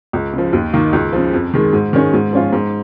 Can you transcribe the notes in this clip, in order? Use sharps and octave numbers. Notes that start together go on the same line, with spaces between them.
C#2
C#3 F3
D#2
D#3 A#3 D#4
C#2
C#3 F3
F2
D#3 G#3
G#2
D#3 G#3 C#4
G#2
F3 C#4 F4
G#2